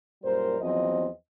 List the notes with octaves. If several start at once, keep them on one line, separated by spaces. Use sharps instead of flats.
F#2 A#2 G3 A#4 C5
E2 F3 F#3 C4 D#5